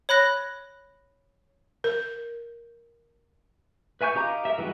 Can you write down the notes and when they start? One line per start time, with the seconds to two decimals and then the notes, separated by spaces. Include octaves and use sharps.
0.09 C#5 B5 F#6 A#6
1.84 A#4
4.01 B4 E5 G#5 C#6 G6
4.15 D#4 G4 F5 A#5 D6
4.45 A#4 E5
4.58 E3 G3 G#3 D#4 F#4